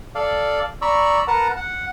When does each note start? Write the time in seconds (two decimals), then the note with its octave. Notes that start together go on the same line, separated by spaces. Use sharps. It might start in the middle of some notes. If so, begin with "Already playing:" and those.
0.15 A4 D5 F5
0.82 D5 A#5 B5 C#6 E6
1.27 A#4 B4 F#5 A5 A#5
1.56 F#5